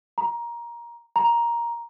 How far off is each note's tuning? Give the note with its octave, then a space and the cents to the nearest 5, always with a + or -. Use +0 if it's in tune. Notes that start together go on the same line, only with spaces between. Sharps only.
A#5 +15
A#5 +10